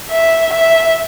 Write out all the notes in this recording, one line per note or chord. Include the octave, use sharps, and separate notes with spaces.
E5
E5